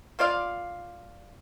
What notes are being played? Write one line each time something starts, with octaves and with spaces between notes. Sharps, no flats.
A#3 F4 D5 F5